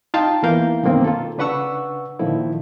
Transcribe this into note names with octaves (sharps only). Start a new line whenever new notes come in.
D#4 F4 F5 G5 A5
E2 E3 A#3 A#4 F5 G6
F#2 B2 D#3 A#3 C4
F4 A4
C#3 D4 B4 F#5 C#6 E6
A#2 D3 D#3 F3 E4